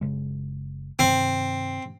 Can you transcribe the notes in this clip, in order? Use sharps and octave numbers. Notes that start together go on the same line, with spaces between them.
F#1 C#3 G#3
G2 C3 D#3 C4